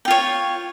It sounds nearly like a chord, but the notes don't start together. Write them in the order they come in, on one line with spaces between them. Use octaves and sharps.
G5 F4 C#5